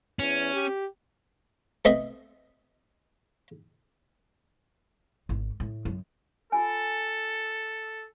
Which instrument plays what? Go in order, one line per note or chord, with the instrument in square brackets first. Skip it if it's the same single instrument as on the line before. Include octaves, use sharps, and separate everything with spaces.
[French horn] E2 [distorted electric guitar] C#4
[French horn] G4
[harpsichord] A3 B3 C4 D#5 E5
[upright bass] G#1
A2
F#2
[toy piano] F4 G#5 [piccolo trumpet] A4